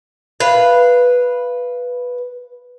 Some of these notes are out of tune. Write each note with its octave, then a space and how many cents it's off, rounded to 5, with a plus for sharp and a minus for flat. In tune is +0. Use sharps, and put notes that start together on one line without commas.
B4 -5 F5 -15